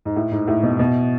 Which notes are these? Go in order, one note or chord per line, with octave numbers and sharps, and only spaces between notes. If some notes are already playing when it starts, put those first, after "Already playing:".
G#2
A2
G#2
A2
B2
B2